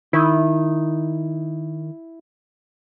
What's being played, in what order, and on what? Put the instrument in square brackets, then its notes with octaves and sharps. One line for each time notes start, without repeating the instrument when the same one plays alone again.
[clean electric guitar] D#3 [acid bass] E4